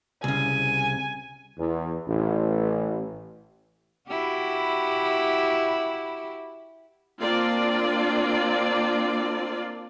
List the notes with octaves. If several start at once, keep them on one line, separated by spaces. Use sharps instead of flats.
C2 C#3 G#5
E2
A1
E4 F#4 G4
A#3 C4 D4 F4 D5